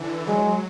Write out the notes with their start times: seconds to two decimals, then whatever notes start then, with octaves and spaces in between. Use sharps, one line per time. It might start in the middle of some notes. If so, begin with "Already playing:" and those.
Already playing: D3 E3
0.27 F#3 G#3